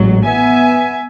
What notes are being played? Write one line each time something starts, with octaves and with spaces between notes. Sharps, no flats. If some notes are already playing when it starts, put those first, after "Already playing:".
Already playing: A1 G#2 F#3
B3 E5 G#5